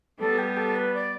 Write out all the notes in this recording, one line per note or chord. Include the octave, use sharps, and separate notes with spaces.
G3 B3 A4
G4
A4
B4
D5